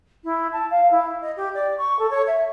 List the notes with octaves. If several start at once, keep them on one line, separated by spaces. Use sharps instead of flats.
E4
A5
F5
E4
D#5
G4
D5
C#6
A4
C#5
E5